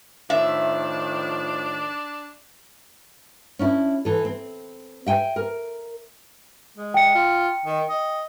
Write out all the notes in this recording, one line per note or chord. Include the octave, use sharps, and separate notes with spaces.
A2 D#3 F3 D4 E5
C#4 D4 E4
E3 A4
C4
E5 G5 G#5
A#4
G#3
G5 C#7
F4
D#3
D#5